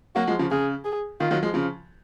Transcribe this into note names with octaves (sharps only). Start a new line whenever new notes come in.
F#3 A#3 F#4
F3 G#3
C#3 F3
C#3 G#4
G#4
D#3 F4
D#3 F#3
F3 G#3
C#3 F3